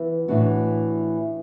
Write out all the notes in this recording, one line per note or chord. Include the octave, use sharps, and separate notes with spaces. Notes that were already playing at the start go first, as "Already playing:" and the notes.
Already playing: E3 B3
A2 E3 D4 F#4